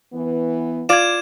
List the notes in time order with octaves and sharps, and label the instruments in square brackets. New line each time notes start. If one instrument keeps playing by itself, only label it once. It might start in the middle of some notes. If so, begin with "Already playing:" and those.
[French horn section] E3 B3
[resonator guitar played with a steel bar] F4 D5 [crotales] G#6 E7